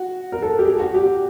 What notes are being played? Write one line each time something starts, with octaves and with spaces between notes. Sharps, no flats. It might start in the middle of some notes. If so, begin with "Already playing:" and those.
Already playing: F#4
A#4
A4
G4
G#4
F#4
G4